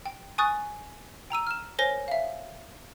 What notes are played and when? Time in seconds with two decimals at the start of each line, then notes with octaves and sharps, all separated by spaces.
0.06 G5
0.38 G#5 C#6 D#6 F#6 A6
1.30 G5 A#5 E6 D#7
1.47 F6 E7
1.79 A#4 C5 C#5 G#5 A#6 G7
2.08 E5 F5